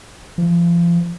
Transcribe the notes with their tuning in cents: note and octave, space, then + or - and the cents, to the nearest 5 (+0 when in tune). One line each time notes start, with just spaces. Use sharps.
F3 -35